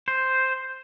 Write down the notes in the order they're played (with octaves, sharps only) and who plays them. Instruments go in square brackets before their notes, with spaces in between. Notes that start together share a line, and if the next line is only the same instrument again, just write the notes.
[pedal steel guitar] C5